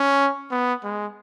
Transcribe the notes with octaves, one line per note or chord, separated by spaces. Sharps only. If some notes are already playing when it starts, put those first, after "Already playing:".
Already playing: C#4
B3
G#3